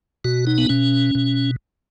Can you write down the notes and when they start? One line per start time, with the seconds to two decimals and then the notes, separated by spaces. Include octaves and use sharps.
0.25 B2 F#4
0.47 D#4
0.58 B3
0.69 B2 C#4
1.15 B2